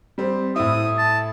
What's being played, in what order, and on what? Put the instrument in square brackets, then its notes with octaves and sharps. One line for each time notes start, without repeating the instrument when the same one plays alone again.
[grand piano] G3 C4
[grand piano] A2 E4 [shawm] D#6
[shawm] A5